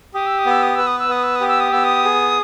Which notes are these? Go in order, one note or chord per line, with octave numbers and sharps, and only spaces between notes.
G4 D#6
E6
D#6
B3
E6
D#6
B4 E6
D#6
E6
B3 D#6
E6
G4 D#6
E6
D#6
B3 E6
D#6
G#4